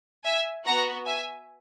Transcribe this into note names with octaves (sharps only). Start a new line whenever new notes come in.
E5 G#5
B3 F#4 F#5 A#5
E5 G#5